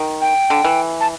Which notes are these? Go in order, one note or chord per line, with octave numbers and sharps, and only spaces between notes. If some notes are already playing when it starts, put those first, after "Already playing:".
Already playing: D#3
G5
D3
E3
A5